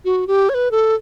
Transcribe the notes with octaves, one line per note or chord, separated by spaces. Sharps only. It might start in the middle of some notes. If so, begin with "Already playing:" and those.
F#4
G4
C#5
B4
A4